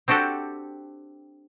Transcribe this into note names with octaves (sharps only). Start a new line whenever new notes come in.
C4 D4 F#4 G4 A4